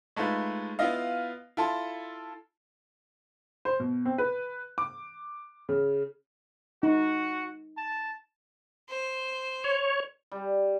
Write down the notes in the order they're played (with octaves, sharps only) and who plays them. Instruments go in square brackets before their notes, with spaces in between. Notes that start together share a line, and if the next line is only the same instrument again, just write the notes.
[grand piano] G#3 A3 D#4 F4 B4
B3 E4 F4 D#5 F5
E4 F4 A4 A5 C6
[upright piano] C5
B2
C4
B4
D6
C#3
[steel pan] D#4 [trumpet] F#4
[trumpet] A5
[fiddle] C5
[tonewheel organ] C#5
[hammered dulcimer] G3